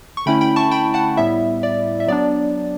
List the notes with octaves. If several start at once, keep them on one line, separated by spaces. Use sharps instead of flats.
C#6
D3 A3 C#4 E4 G5 B5
G5 B5
A5 C#6
G5 B5
F#5 A5
A2 G3 B3 E4 E5
D5
E5
F#3 B3 D4 D5